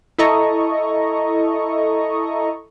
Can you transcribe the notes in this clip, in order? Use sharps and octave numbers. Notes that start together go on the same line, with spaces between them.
E4 A4 D#5 A#5 C#6